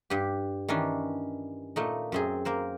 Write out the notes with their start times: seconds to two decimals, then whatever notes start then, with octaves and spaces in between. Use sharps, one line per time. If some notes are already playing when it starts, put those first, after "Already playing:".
0.10 G2 G4
0.68 D#3 E3 C#4 D4
1.76 A#2 A3 D#4
2.12 F#2 C4 G#4
2.45 A#3 A#4 C5